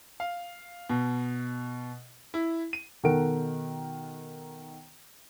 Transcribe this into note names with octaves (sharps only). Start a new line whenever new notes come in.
F5
B2
E4
D#7
B2 D#3 A4 A#4 F#5 D7